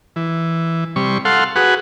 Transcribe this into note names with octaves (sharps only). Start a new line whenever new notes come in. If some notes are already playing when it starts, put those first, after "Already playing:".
E3
C3 G3 C#6
A4 F5 F#5 C6
F#4 G#4 B4 F#5